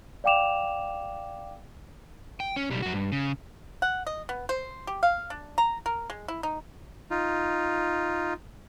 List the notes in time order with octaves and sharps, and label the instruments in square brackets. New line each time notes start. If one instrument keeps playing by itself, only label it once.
[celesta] D5 F5 G5 D6 E7 F7
[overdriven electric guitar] G5
C#4
B1 G3
F#2 F#4
G2
C#3
[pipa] F#5
D#5
B3
C5
G4
F5
D4
A#5
A#4
G#3
E4
D#4
[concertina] D#4 F4